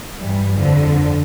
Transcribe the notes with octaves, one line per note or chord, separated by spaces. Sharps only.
G2 E3 G3
F2 D3 F3